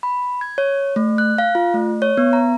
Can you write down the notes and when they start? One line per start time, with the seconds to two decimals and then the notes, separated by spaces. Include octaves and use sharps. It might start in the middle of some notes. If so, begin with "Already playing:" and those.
0.03 B5
0.41 G#6
0.58 C#5
0.96 A3
1.18 F#6
1.38 F5
1.55 F4
1.74 A3
2.02 C#5
2.17 B3
2.33 A#5